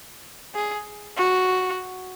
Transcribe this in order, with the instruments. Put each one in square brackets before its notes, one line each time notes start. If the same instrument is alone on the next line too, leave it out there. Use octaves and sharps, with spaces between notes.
[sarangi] G#4
F#4